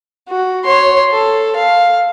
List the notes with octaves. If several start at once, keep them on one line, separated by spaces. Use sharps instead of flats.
F#4
C#5 C6
A4
F5